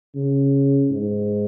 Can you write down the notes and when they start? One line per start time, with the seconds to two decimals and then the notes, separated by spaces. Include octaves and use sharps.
0.15 C#3
0.91 G#2